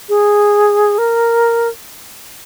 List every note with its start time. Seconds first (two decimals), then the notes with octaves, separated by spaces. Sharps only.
0.09 G#4
0.98 A#4